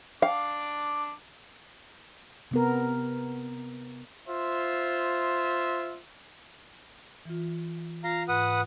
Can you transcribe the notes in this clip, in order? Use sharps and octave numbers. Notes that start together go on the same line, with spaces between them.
D4 F5 D6
C3 B3 A#4
F4 C5 E5
E3 F4
F4 F5 A#5
G#2 B4 F#5 D#6